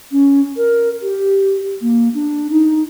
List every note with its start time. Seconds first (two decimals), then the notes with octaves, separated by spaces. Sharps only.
0.12 C#4
0.57 A#4
1.02 G4
1.81 A#3
2.14 D4
2.50 D#4